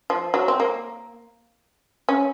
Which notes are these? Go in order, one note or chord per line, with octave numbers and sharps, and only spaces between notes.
F3
F#3
C4
A#3
C#4